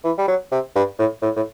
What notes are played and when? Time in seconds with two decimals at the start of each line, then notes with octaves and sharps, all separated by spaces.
0.04 E3
0.18 G3
0.28 F#3
0.52 C3
0.76 G2
0.99 A2
1.22 A2
1.36 A2